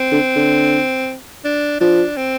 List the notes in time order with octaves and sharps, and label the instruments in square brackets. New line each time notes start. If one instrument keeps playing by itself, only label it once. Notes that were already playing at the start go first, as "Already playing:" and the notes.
Already playing: [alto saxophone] C4
[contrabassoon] D3
D3
[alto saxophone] D4
[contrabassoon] F3 [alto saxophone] D4
[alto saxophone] C4